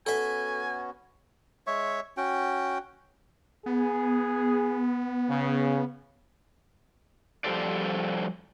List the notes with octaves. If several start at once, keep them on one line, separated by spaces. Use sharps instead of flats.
B3 C#4 F#4 A4 E5 G#5
G#3 C#5 E5 C#6
C#4 F#4 G5
B3 G#4
C#3
F3 G3 G4 A4 C5 D5